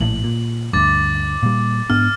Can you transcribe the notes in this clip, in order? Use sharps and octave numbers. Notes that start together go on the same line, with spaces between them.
A#1 A2 F#7
A#2
D2 G2 D6 A6
A#2 G3
G#2 B3 D4 F6